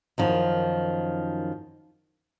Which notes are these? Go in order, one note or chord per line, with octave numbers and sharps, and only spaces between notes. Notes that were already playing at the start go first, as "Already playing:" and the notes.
F#2 D#3 F3